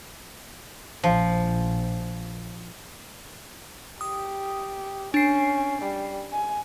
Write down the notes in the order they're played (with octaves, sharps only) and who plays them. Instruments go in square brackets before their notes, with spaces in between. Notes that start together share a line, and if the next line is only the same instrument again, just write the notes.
[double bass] A#1 [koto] F3
[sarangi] G4 [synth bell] D#6
[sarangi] C#4 [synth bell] D4 C7
[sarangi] G3
G#5